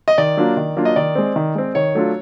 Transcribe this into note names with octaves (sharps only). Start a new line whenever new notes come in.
D#5
D#3 D5
F#3 A#3 D4 F4
D#3
F#3 A#3 D4 F4
D#5
D#3 D5
G#3 C4
D#3
G#3 C4
D#3 C#5
F#3 A3 D4 F4